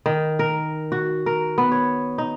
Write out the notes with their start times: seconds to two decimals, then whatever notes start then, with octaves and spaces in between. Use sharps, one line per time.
0.06 D#3
0.39 A#4
0.92 F#4
1.26 A#4
1.58 B3
1.72 C#5
2.18 D#4